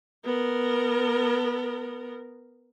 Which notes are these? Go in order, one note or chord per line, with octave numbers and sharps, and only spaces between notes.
B3 A#4